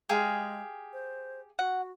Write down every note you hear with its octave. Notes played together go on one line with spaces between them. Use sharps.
G#3 G4 G#4 F5
C5
F#4 F#5